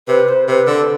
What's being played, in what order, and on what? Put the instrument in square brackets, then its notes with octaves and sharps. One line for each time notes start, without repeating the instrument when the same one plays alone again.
[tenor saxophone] C3 [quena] B4
[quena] C5
[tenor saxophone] C3 [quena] B4
[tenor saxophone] D3 [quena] A4